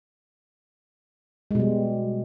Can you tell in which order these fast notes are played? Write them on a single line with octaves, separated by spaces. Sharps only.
G#3 B2 G3